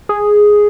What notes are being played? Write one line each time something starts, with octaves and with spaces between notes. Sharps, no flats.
G#4